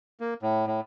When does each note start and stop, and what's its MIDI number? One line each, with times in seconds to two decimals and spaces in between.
0.20 0.34 58
0.42 0.65 45
0.67 0.80 45